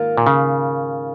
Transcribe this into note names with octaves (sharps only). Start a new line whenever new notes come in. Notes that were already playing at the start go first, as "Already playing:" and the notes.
Already playing: G#2 D#3 A#3 F4
A#2
C#3